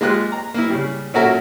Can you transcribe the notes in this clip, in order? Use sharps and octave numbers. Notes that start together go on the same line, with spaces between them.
G#3 A#3 F4 G4 F#6
A#5
A#3 E4
C#3 G3
A#2 C#4 F#4 A4 A#4 E5